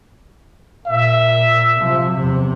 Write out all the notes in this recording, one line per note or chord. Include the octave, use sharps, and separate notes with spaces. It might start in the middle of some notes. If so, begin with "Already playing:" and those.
A#2 E5
C3 F3
E2 C3